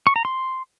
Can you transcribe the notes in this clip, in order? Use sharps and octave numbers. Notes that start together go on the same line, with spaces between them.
C#6
A#5
C6